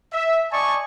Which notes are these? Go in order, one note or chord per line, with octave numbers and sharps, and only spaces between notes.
E5
D5 D#5 G#5 A5 C#6